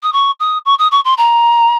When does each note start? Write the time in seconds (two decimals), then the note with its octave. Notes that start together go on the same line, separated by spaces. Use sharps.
0.03 D#6
0.13 C#6
0.40 D#6
0.65 C#6
0.79 D#6
0.91 C#6
1.05 C6
1.18 A#5